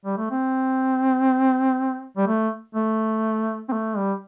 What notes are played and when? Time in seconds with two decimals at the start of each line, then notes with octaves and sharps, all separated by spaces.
0.05 G3
0.17 A3
0.31 C4
2.17 G3
2.27 A3
2.75 A3
3.69 C4
3.72 A3
3.97 G3